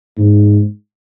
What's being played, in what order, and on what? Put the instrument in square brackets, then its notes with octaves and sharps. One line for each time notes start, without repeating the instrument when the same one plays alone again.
[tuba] G#2